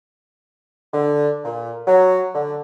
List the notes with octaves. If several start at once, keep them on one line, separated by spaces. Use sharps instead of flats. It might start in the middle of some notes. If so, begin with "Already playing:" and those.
D3
A#2
F#3
D3